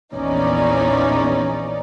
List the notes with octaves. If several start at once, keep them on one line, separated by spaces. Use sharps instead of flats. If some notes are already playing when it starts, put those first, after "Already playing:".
A#1 E2 C#4 D#4 D5